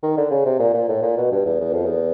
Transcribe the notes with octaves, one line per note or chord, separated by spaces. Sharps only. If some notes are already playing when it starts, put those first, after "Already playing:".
D#3
D3
C#3
C3
A#2
A#2
A2
A#2
B2
G2
E2
E2
F2
E2